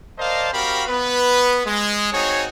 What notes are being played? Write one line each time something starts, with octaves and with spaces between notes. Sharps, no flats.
A#4 C5 D5 D#5 F5 A5
C4 F#4 G4 A#4 F5 B5
B3 B4
G#3
C4 D#4 F#4 G#4 C#5